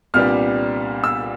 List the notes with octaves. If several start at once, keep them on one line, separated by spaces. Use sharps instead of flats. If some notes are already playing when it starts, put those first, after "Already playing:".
C2 A#2 G3 B3 D4 F6
E6